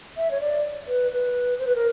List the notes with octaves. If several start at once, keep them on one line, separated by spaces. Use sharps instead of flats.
E5
C#5
D5
B4
B4
C5
B4
A#4